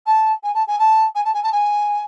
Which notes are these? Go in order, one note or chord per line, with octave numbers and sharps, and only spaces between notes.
A5
G#5
A5
G#5
A5
G#5
A5
G#5
A5
G#5